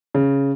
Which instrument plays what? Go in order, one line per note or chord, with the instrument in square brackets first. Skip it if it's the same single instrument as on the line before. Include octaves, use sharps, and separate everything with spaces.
[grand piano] C#3